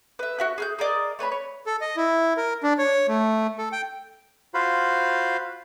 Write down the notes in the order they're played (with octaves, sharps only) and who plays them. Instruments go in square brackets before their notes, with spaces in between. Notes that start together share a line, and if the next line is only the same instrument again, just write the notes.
[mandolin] B4 E5
F#4 E5 F#6
G#4 F6 G6
G#4 A#4 D5 D#5
A3 B4 C#5 B5
C#5
[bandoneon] A4
D#5
E4
A#4
D4
C#5
A3
A4
G5
[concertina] F4 F#4 C5 F5 B5